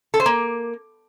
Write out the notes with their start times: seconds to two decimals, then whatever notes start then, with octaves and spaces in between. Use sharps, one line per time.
0.14 A4
0.20 C5
0.26 A#3